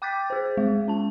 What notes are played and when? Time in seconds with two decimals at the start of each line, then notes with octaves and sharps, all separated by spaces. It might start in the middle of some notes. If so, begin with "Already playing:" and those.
0.02 G5 D6 F#6 G6 A6 B6
0.30 G#4 C5
0.57 G#3
0.88 C#4 A5